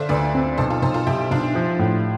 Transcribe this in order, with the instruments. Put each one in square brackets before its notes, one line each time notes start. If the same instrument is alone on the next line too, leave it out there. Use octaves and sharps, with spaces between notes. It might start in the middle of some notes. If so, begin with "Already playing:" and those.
Already playing: [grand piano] D3 [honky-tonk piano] D4 F4 C5 E5
[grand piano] D2 [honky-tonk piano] B4 D5
[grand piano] C4
[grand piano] B1 [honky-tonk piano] A4 C5
[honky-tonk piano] F4 A4
[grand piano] B1 [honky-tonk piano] A4 C5
[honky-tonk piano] F4 A4
[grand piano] B1 [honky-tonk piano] E4 G4
[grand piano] B1 [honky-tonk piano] D4 F4
[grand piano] F3
A2